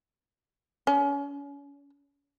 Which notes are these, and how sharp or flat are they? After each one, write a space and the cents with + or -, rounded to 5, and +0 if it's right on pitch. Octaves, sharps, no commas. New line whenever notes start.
C#4 +35